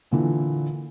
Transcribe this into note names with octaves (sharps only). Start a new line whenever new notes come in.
A#2 D3 E3